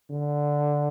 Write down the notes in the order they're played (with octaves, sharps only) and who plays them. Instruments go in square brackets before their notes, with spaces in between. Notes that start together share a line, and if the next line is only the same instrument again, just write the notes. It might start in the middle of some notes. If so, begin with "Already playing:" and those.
[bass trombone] D3